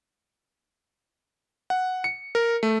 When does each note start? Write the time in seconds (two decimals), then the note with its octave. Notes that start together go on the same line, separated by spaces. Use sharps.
1.70 F#5
2.04 C#7
2.35 A#4
2.63 A3